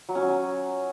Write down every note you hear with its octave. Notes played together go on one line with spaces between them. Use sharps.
F#3
C#4
F#3